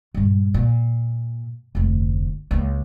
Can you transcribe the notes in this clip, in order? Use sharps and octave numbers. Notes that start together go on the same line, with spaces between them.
G2 A#2
A#2
F1 D2
C#2 A#3